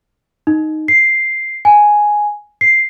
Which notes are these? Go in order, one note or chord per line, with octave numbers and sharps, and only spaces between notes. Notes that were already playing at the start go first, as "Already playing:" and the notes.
D#4
C7
G#5
C7